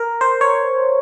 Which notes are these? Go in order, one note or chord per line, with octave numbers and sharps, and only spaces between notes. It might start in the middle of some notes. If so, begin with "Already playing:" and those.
Already playing: A#4
C5
C#5